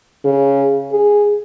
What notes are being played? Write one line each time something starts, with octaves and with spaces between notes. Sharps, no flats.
C#3
G#4